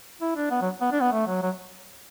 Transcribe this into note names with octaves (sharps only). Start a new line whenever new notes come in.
E4
D4
B3
F#3
B3
D4
B3
A3
F#3
F#3